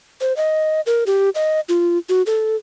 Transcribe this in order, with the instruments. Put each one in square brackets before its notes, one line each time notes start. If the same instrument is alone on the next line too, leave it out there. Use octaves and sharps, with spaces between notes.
[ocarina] C5
D#5
A#4
G4
D#5
F4
F#4
A4